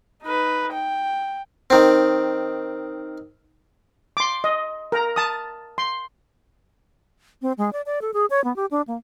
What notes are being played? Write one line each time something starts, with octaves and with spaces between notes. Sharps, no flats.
D#4 B4
G5
D#3 C4
C6 D6
D#5
A#4 A#5
A5 D#6
C6
C4
G#3
D5
D5
A4
G#4
C#5
B3
G4
D4
A#3